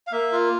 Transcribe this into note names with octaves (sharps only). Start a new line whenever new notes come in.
F5
A#3 E5
F4